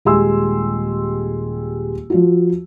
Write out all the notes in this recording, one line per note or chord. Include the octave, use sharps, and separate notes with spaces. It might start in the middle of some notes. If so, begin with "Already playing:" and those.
D#1 G#3 G4 G#5 C6 E6
F3 F4 F#4